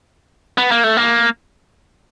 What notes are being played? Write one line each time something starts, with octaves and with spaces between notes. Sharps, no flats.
B3
A#3
A3
A#3